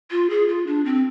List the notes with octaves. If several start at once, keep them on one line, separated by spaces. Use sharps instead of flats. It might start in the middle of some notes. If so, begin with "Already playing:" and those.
F4
G#4
F4
D4
C4